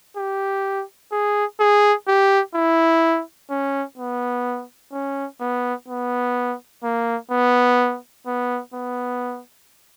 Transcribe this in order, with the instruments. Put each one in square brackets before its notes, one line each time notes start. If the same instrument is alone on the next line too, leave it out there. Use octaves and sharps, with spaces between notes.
[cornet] G4
G#4
G#4
G4
E4
C#4
B3
C#4
B3
B3
A#3
B3
B3
B3